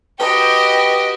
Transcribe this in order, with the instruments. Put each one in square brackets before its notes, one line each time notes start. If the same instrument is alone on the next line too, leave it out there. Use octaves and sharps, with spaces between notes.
[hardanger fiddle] F#4 G4 [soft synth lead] B4 [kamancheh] D#5 [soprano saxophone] G5